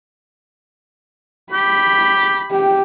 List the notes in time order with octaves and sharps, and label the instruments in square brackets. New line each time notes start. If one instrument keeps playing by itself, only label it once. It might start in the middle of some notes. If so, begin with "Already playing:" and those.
[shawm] G4 [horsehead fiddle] B5
[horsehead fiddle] G4 G5